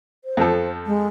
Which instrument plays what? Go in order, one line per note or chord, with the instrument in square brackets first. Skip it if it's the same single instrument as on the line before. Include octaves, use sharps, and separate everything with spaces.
[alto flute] C5
[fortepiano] F2 F3 A4
[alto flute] G#3